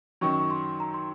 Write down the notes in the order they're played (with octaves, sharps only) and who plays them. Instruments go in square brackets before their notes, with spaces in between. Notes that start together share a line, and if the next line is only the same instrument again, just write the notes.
[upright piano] F#2 D#3 F#3 [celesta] C#6
[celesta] C6
A#5
C6